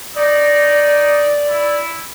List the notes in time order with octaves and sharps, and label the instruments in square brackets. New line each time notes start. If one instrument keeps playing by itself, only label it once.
[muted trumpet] D#4 [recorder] D5
[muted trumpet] E4